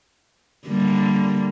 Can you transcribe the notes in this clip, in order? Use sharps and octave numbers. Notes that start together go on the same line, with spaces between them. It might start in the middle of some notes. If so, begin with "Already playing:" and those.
D3 G3 A#3